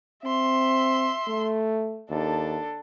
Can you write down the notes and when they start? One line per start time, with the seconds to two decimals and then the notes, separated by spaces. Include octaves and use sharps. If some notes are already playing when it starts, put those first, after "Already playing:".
0.24 C4 E5 C6
1.28 A3
2.10 D#2 D4 A4